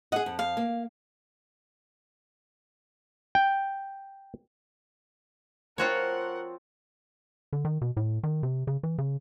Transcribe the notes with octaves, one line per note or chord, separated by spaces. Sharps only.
G#4 D#5 F#5
F2
F5
A#3
G5
F3 C4 F4 F#4 A#4 C#5 F5 F#5
D3
D#3
B2
A2
D#3
C3
C#3
E3
C#3